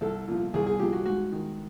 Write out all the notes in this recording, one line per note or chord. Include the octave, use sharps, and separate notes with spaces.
C2 A4
A#2 F3
C2 G#4
G#4
A#2 F3 G4
F#4
G#2 F#4
D#3